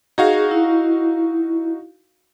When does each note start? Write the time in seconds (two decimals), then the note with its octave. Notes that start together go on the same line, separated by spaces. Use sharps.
0.18 D#4 F#4 G#4 F5
0.51 E4